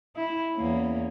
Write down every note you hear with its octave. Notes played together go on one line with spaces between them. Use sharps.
E4
E2 A#3 C#4